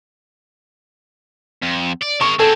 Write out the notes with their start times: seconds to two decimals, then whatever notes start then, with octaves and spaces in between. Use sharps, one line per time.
1.63 F2
2.02 D5
2.21 G#3 A#4 C#6
2.39 C4 G#4 A4